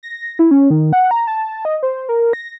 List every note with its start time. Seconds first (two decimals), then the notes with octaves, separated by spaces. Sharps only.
0.03 A#6
0.39 E4
0.51 C#4
0.70 D#3
0.93 F#5
1.11 A#5
1.27 A5
1.65 D#5
1.83 C5
2.09 A#4
2.33 A#6